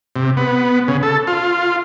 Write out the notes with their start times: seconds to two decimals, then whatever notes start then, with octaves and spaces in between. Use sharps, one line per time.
0.16 C3
0.37 B3
0.88 C#3
1.03 A4
1.27 F4